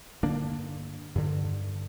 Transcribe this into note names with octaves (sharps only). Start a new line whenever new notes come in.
G2 D3 A#3 D4
G2 D3